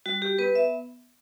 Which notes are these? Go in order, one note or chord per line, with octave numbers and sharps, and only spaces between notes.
G3 F#4
G4
B3 B4
E5